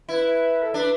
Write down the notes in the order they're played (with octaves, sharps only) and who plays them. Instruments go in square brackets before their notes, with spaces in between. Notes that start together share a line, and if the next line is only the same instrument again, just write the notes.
[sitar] E4 [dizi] B4
[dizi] A4
[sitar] D4 [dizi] B4